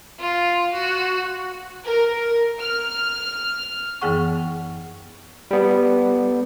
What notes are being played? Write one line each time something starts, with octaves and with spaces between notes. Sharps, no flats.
F4
F#4
A#4
F6
F#2 E3 B3 G#4 F#5 C#6
G3 B3